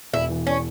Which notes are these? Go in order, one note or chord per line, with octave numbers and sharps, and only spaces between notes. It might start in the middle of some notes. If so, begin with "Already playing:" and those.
E1 E4
E3
C#4